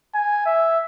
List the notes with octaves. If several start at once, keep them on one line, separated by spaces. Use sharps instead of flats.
G#5
E5